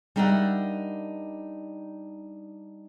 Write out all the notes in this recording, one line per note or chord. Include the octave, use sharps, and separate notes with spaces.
G3 D4 D#4 A#4 E5 F#5